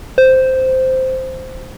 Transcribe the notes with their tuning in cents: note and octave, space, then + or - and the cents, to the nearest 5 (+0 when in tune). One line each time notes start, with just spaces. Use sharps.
C5 -5